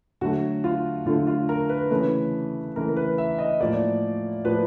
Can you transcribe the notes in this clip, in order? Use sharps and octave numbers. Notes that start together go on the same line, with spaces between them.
D3 F#3 A3 F#4
F4
D3 F#3 A3 F4
F4
A#4
B4
C#3 E3 A3 B4
C#3 E3 A3 A#4
A#4
B4
E5
D#5
A2 F3 A#3 D5
A2 F3 A#3 B4